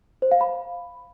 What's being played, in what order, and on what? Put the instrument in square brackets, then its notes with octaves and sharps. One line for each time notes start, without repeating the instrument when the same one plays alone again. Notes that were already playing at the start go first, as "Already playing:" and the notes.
[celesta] C5
F5
B5